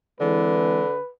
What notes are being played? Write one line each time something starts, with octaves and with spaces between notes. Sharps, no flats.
D3 E3 G#3 C4 B4